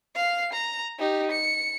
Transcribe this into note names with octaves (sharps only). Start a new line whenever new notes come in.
F5 C7
A#5
D#4 G4
C#7